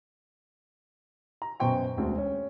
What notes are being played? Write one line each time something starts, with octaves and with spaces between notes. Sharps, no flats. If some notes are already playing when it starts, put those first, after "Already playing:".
A#5
F#2 B2 C5 G5 C#6
E1 D2 C4 F#4
C#4